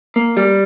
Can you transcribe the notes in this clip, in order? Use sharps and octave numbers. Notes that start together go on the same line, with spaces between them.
A#3
G3